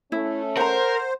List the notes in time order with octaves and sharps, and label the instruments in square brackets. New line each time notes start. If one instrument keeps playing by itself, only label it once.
[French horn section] A3 C#4 [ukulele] E4
[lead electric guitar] A#4 [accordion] C5 [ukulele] F#5 A#5